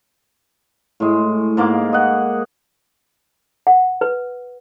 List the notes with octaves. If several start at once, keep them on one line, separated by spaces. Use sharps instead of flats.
A2 G#3
G#2 A#3 F5 D6
D#5 F#5
F#5
B4